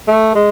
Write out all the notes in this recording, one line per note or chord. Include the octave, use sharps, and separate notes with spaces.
A3
G#3